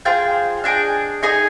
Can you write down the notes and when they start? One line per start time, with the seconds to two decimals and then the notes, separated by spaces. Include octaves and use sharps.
0.05 F4 G#4 C5 G5
0.64 D4 G#4 D#5 G5
1.23 D#4 G#4 D#5 G#5